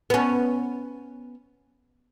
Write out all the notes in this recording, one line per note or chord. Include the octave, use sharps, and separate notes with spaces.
B3 C#4